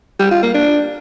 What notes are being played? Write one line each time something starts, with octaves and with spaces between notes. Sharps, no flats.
G3
F4
A#3
D4